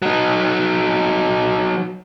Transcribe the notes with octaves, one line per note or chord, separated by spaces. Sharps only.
F#3 D#4